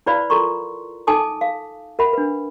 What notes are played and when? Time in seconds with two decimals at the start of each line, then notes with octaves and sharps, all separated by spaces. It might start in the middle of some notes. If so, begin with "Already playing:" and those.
0.06 E4 B4 C5 D5 F5 B5
0.30 F4 A4 A#4 A#5 C6 C#6
1.07 D#4 A4 G#5 A5 D6 D#6
1.41 F5
1.99 A#4 E5 F#5 B5
2.13 D4 B4